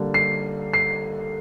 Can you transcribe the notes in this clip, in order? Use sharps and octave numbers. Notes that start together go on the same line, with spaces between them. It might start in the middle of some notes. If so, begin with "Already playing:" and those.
Already playing: D3 G3 A#3
C7
C7